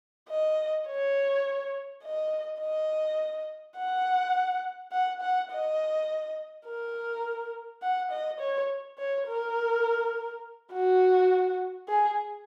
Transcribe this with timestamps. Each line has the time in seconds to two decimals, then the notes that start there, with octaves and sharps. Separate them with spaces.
0.29 D#5
0.87 C#5
2.03 D#5
2.61 D#5
3.76 F#5
4.92 F#5
5.21 F#5
5.51 D#5
6.67 A#4
7.82 F#5
8.11 D#5
8.40 C#5
8.98 C#5
9.28 A#4
10.73 F#4
11.88 G#4